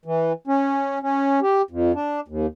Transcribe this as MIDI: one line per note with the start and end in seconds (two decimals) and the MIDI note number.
0.05 0.33 52
0.47 0.99 61
1.02 1.40 61
1.42 1.62 67
1.71 1.92 41
1.94 2.20 62
2.28 2.46 39